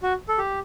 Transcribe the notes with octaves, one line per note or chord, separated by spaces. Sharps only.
F#4
A4
G4